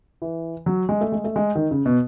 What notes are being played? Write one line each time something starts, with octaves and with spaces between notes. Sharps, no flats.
E3
F#3
G#3
A3
G#3
A3
G#3
D#3
C#3
B2